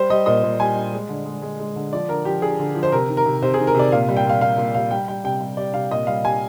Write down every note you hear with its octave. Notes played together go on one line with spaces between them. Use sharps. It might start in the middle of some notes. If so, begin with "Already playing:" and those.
Already playing: G3 C5
G3 D#5
A#2 D#5
A#2
G3 G#5
G3
G#3
D3
G#3
G#3
G#3
D3
F3 D5
D3 A#4
F3 G4
D3 G#4
D3
F3
C5
C3 A#4
D#3
A#4
C3
C3 C5
G#4
D#3
A#4
C3 D5
A#2 F5
G3
G5
A#2 F5
A#2 F5
A#2
G3 F5
G3 G5
G3 G5
C3 G5
G3
G3 D5
C3 F5
A#2 D#5
G3 F5
G3 G#5